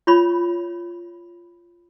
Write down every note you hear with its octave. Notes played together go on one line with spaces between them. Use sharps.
F4 C#5 B5